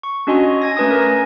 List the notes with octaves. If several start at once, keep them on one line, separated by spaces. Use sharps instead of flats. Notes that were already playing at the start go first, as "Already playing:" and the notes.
C#6
C#4 D4 F#4 D#5 G#5 C6
G#5 G#6 A#6
A3 C#4 B4 G#5 D#6
A#4 A#6